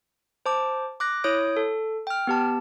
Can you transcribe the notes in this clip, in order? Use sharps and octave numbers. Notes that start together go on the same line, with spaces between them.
C5 A5 D6
D6 F#6 A#6
E4 C#5 D#6 G6 D7
A4
G5 F6
B3 G4 A5